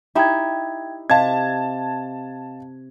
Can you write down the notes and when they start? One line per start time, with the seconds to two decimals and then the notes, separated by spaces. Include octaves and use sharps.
0.15 D#4 E4 G4 E5 G5 G#6
1.10 C3 D#5 F5 A5 G#6